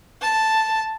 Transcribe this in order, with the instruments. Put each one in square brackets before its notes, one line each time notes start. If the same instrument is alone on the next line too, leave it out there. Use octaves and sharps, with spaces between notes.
[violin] A5